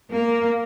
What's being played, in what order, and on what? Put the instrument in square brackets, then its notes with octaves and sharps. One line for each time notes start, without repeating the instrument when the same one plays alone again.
[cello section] A#3